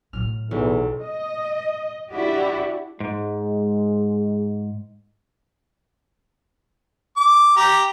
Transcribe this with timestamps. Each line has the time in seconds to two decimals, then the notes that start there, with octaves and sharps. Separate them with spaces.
0.13 A2 F#3 F6
0.51 B1 E2
1.03 D#5
2.10 D4 E4 F#4 G4 D5
3.00 G#2 G#3
7.17 D6
7.57 G4 A#5